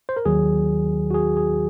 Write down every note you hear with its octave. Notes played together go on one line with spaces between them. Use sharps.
C5
A#4
D#2 D#3 F#3 G#4
F#4
G#4
G#4